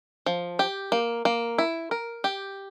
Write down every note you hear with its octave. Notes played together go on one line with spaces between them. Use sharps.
F3
G4
A#3
A#3
E4
A#4
G4